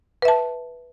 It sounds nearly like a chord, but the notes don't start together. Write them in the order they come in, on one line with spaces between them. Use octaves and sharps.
B4 E5 A5